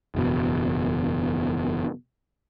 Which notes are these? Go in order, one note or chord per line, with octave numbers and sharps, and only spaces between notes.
F#1 E2 B2